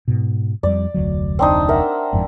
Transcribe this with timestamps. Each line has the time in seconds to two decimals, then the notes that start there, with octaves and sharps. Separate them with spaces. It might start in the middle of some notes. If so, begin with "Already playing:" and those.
0.08 G#2 B2
0.63 F2 G3 D5
0.94 F1 D2 F#3
1.39 C4 D4 D#4
1.69 A#4 E5 F#5
2.13 G1 F2 G#2